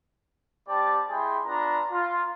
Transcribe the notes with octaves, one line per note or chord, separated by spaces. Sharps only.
G3 C4 G4 D5 A5
G#3 E4 G#4 G5 C6
B3 D4 F4 A#5
F4